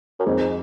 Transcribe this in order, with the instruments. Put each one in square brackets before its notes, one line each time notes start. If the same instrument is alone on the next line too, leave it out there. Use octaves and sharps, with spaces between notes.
[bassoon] F#2
[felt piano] F2 [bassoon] G#2